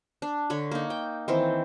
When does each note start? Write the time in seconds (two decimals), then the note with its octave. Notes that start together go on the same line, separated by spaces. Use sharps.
0.22 D4
0.50 D3 C#5 B5
0.71 A#3 D#4
0.90 G5
1.28 D#3 E3 C4